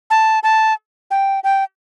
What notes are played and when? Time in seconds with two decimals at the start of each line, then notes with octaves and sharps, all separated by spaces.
0.10 A5
0.43 A5
1.11 G5
1.44 G5